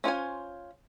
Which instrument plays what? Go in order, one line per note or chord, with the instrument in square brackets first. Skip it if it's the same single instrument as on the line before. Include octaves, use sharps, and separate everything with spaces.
[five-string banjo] C#4 F4 C5 G#5